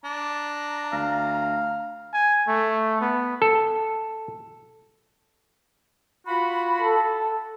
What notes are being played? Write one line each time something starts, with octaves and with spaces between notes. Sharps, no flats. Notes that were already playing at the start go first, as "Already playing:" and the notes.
D4 A#5
D2 F5
G#5
A3
B3
A4
F4 F#4 B5
A4